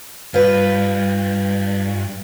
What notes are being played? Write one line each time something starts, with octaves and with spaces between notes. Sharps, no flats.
G2 F4 B4